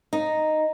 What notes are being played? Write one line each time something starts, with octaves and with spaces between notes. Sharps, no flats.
D#4